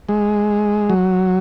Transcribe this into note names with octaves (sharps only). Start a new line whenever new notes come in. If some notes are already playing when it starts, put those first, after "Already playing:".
G#3
F#3